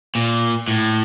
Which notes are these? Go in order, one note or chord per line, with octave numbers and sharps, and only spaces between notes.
A#2
A2